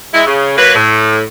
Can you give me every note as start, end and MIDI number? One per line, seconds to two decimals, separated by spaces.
0.14 0.27 56
0.14 0.27 64
0.27 0.57 49
0.57 0.74 54
0.57 0.74 58
0.57 0.74 71
0.75 1.21 45